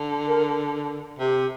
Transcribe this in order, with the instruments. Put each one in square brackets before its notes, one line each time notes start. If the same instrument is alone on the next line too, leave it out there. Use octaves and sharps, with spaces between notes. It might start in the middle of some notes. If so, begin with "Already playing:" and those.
Already playing: [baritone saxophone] D3
[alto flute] A#4
[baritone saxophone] C3 [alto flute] G4